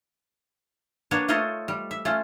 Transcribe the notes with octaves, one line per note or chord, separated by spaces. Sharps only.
A#3 B3 D4 C#5
A3 F4 A4 C5 C#5 D#5
G3
E5
A3 C#4 F4